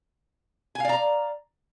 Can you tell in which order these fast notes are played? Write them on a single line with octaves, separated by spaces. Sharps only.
G#5 F5 D5 A#5